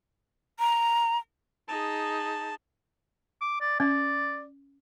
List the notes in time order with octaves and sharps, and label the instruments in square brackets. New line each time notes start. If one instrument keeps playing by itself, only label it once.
[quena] A#5
[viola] D#4 G#4 [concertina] A5
[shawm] D6
D5
[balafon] C#4 [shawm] D5